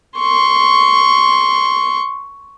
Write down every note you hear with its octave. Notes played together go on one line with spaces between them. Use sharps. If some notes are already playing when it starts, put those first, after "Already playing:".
C6 C#6